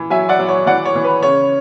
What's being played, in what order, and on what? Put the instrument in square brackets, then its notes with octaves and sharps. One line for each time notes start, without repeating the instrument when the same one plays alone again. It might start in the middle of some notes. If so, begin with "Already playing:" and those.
Already playing: [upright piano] E3
F#3 E5 G#5
D5 F#5
F#3
C#5
E3 D5 F#5
C#5
E3
B4
C#3 C#5